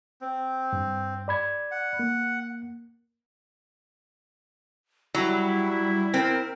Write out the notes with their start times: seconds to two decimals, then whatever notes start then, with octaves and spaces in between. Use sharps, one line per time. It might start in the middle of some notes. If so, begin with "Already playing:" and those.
0.21 C4
0.73 G2
1.28 D5 B5 G#6
1.71 F#5
1.99 A#3
5.15 F#3 G3 E4
6.14 C4 A#4